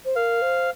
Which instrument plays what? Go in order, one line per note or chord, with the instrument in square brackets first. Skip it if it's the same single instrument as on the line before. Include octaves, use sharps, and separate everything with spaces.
[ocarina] C5
[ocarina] A#4 [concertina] F5
[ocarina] C5